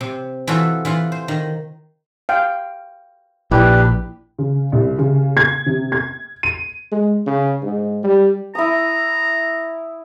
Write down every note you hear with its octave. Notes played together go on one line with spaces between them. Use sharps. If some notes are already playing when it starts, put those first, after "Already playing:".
C3
E3 F4 F#4 A4
E3 F4 F#5
C5
D#3
F5 G5
A#1 D4 E4 G4 B4 G5
C#3
C2
C#3
G#6
C3
G#6
D#7
G#3
C#3
G#2
G3
E4 A#5 D#6